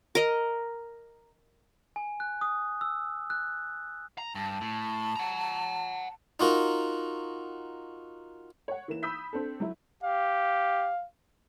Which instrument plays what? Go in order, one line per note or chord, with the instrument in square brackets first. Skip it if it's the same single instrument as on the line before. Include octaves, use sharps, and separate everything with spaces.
[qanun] A#4 D#5
[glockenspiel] G#5
F#6
D#6
E6
F#6
[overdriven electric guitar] A#5
[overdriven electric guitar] G2 [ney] A5
[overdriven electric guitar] A2
F#5 A#5
[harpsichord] D#4 F4 F#4 A#4
[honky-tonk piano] C#5 F#5
E3 A#3 E7
B5 D#6 E6 G6 B6
C4 D4 A4
F#3 E4
[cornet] G4 [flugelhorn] F5